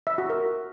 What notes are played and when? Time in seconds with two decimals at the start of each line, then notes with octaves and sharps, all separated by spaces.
0.07 E5
0.18 F#4
0.30 A#4